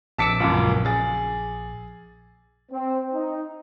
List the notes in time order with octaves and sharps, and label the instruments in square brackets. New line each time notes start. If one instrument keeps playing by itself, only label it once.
[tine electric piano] A#1 D6 E6 [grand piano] A5 B6 C#7
[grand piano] C#2 F#2 A#2
G#4 A6
[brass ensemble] C4
D#4